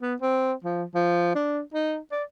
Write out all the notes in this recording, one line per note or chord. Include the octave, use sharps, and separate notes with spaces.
B3
C4
F3
F3
D4
D#4
D5